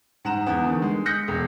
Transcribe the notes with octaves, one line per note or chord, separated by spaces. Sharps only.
G#2 F#5 A#5 E7
E2 B3
D3 D#3
G#3
D#6 F#6 G6 A#6 B6 C#7
E1